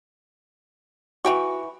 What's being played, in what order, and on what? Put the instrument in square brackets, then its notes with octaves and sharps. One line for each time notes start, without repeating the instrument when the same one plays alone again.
[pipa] E3 G5 C#6 [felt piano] F#4